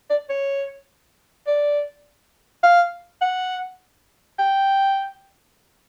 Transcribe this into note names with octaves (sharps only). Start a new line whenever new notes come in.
D5
C#5
D5
F5
F#5
G5